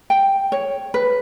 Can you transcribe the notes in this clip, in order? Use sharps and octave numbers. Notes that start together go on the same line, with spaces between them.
G5
C#5
B4